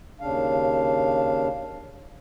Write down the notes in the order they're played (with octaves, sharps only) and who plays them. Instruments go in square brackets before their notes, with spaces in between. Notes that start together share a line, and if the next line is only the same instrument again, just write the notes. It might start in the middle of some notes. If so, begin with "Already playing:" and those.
[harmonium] D#2 C#3 D4 F5